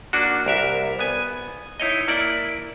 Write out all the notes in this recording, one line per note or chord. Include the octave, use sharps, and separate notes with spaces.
A#3 D4 F#4
C2 A#4 E5
B3 G#5
D#4 E4 C#5 D#5
A#3 E4 D5